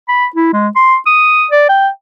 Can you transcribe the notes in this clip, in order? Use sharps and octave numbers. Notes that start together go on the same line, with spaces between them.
B5
E4
G#3
C6
D#6
D5
G5